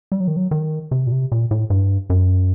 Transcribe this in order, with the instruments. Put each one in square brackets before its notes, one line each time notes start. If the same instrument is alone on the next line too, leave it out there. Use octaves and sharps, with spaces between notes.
[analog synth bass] G3
F#3
D#3
F#3
D#3
C3
A#2
C3
A#2
A2
G2
F#2